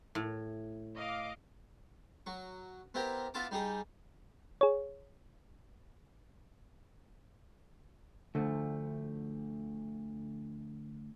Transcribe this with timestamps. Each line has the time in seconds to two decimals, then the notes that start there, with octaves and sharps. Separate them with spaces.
0.15 A2
0.94 D#5 F5 D6
2.26 F#3 C#6
2.94 B3 C4 E4 G4 A#4
3.34 B3 E4 F4 F5 A5 D6
3.51 G3 D#4 G4 G#4
4.61 G#4 C#5
8.35 D2 D3 F3 A3